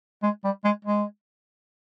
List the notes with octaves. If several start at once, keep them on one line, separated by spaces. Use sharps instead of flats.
G#3
G3
G#3
G#3